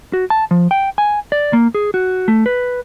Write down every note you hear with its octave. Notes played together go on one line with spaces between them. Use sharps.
F#4
A5
F3
G5
G#5
D5
A#3
G#4
F#4
A3
B4